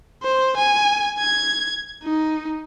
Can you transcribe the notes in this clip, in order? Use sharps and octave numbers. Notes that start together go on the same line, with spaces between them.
C5
G#5
G#6
D#4